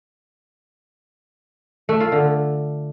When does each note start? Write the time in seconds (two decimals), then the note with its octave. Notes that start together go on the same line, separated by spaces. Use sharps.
1.89 A3
2.00 F4
2.12 D3